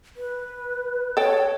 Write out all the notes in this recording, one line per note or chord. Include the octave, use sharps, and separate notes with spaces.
B4
A4 C#5 G5